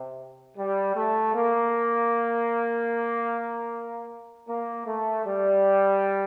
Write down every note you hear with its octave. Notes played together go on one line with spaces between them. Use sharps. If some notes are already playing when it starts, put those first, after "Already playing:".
Already playing: C3
G3
A3
A#3
A#3
A3
G3